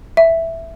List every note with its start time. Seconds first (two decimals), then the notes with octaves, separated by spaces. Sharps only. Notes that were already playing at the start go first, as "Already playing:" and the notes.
0.17 E5